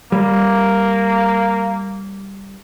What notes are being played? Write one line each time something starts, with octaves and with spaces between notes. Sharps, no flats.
G3 A#3